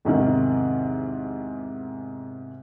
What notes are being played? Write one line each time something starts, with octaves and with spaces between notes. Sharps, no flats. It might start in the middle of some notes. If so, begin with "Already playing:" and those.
E2 G#2 C3 D#3